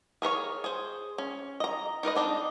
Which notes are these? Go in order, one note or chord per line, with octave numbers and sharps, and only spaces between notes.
G#4 A#4 B4 C#5
G#4 C5
C#4
D#5 A#5
D#4 A#4 B4 D#5
C4 D4 D#4